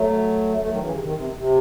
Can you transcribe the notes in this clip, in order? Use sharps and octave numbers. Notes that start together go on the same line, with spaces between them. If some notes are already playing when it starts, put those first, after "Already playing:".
Already playing: F#3 A3
F#3 A3
E3
D#3 F#3
C#3 E3
C3 D#3
C3 D#3
C3
C3